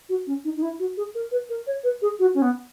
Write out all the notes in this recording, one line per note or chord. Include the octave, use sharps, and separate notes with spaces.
F#4
C#4
D#4
D#4
E4
F#4
G#4
A#4
B4
A#4
C#5
B4
G#4
F#4
C#4
B3